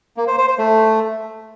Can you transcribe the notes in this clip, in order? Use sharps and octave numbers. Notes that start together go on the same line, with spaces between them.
A#3
C5
C5
C5
A3